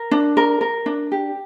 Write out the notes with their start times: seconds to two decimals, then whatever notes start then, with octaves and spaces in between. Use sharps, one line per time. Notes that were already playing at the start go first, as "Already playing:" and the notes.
Already playing: A#4
0.11 D4
0.37 A#4
0.61 A#4
0.86 D4
1.12 G4